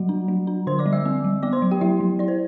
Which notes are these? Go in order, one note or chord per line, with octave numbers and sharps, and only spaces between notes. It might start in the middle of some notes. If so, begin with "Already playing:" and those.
Already playing: F#3 G3 F#4 F#5
D4
F#3
D4
D3 C5 C6
D5 D6
G3
E5 E6
C4
G3
B3 D5 D6
C5 C6
F#3
G4 G5
F#3 E4 E5
F#3
E4 D5
C5